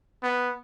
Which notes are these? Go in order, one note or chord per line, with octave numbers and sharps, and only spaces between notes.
B3